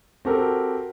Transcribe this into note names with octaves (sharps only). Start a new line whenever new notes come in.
C4 F#4 G4 A4 A#4